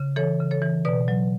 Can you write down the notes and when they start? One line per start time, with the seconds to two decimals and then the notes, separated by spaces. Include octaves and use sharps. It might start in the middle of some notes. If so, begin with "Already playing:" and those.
Already playing: C#3
0.16 E3 A4 C#5
0.40 C#3
0.51 A4 C#5
0.62 E3
0.85 B2 B4 D5
1.08 F#3